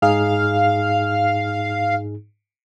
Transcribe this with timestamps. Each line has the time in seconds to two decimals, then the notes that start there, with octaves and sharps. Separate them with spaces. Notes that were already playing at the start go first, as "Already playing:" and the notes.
0.02 G#2 D#4 G#4 F5